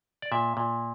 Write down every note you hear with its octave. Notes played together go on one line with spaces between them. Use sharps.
D5
A#2 E5
A#2